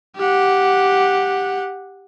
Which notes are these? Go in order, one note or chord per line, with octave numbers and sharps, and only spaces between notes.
G4 F#5